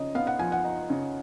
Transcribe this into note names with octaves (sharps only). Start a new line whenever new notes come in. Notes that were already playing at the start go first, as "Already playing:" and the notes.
Already playing: C#3 F3 D#4 D#5
B3 F5
F#5
F3 G#5
F#5
D#4
C#3